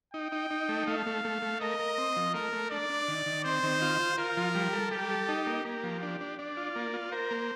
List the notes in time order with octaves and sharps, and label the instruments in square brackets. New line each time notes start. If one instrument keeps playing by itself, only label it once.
[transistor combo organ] D#4 [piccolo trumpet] G5
[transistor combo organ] D#4
D#4
A3
[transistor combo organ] A3 [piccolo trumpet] F5
[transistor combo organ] A3
A3
A3
[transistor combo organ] A#4 [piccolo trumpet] D#5
[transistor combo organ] A#4
C4
F3
[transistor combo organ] A3 [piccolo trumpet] A#4
[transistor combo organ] A3
[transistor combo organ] D4 [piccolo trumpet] D5
[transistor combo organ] D4
D#3
D#3
[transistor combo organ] C4 [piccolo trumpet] C5
[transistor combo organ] D#3
F4
F4
[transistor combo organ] F4 [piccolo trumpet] A#4
[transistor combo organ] F3
G3
A4
[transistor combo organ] G3 [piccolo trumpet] G4
[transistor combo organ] A4
D#4
A#3
[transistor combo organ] A#3 [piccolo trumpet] G4
[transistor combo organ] F3
D4
D4
[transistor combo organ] D4 [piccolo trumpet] D5
[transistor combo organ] F4
A#3
F4
[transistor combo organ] A#4 [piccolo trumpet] C5
[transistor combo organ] A#3